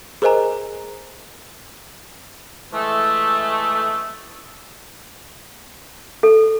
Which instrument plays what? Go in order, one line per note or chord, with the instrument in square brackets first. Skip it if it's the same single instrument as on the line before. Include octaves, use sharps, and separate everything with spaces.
[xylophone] G#4 A#4 C5 D#5 G#5 A#5
[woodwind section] E3 G#3 A3
[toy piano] A4